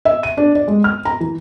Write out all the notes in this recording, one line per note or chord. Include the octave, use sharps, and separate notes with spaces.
E5
D#7
D4
D5
G#3
F6
A#5
E3